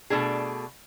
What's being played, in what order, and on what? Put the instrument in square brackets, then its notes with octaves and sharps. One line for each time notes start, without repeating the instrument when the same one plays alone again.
[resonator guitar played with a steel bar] B2 A3 D4 G#4